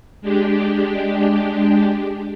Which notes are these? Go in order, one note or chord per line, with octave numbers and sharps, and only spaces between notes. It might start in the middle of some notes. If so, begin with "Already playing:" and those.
G#3 D4 G4